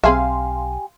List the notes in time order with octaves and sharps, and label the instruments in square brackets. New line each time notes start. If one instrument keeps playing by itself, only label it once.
[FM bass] B1 [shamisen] C4 G#4 E5 [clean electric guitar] G4 G#5 [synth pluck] F5 C6